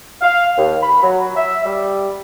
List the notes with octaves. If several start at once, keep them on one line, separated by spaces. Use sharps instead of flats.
F5
D#2
B5
F#3
E5
G3